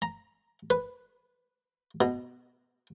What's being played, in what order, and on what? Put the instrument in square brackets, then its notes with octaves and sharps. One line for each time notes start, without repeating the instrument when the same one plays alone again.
[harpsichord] A#5
B4
B2